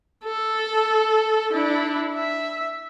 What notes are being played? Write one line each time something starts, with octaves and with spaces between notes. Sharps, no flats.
A4
D4 E4
E5